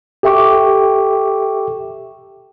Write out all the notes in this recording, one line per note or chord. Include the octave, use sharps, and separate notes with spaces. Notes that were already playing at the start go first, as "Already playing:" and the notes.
G4 A4 E5 G5 C#6 D6